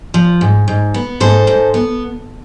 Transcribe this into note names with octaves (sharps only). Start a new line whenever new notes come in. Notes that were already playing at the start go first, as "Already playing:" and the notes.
F3
G#2
G#2
B3
G#2 A4 C5
G#2
B3